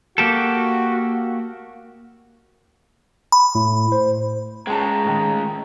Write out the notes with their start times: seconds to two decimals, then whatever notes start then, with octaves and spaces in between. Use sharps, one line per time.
0.18 A#3 F#4 G4 A4
3.32 B5
3.55 A2
3.92 C5
4.67 C#3 G#3 G5 A5 A#5
5.04 A2 D#3